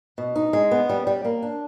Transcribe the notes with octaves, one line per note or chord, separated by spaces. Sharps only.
B2
D#4
G#3
B3
G3
G3
A#3
D4